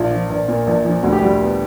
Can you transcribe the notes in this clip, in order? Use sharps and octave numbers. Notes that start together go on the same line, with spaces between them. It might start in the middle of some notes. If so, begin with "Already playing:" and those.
Already playing: A#1 F4
F3
A#1
A#2
A#1
F3
D2 F#4
G4
G3 F#4
B3